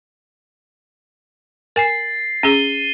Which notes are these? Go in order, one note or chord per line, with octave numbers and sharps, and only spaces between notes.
A#4 G#5 A6 C7
C#4 G#4 D#7 E7 G7